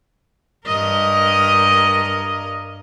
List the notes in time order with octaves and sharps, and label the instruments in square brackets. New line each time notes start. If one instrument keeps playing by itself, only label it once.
[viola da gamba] G2 A#4 D#5